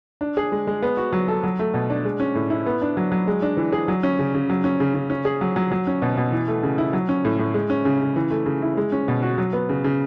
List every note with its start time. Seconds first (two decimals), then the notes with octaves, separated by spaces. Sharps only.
0.21 D4
0.37 G#4
0.52 G#3
0.67 G#3
0.82 B3
0.97 F#4
1.13 F#3
1.28 A4
1.44 F#3
1.59 A3
1.74 B2
1.90 D4
2.05 G#3
2.20 C#4
2.35 A2
2.50 E4
2.66 B3
2.82 D4
2.97 F#3
3.12 F#3
3.28 G#3
3.42 D4
3.57 E3
3.72 G#4
3.88 F#3
4.03 C#4
4.19 C#3
4.34 C#3
4.50 F#3
4.64 C#4
4.80 C#3
4.94 C#3
5.10 C#4
5.25 G#4
5.41 F#3
5.56 F#3
5.71 F#3
5.87 C#4
6.02 B2
6.17 B2
6.32 E3
6.48 A3
6.63 C#3
6.78 E4
6.93 F#3
7.09 C#4
7.25 A2
7.39 A2
7.54 G#3
7.70 C#4
7.85 C#3
8.01 C#3
8.16 E3
8.30 A3
8.46 C#3
8.62 E4
8.77 G#3
8.92 C#4
9.08 B2
9.22 F#4
9.38 F#3
9.53 B3
9.69 C#3
9.84 C#3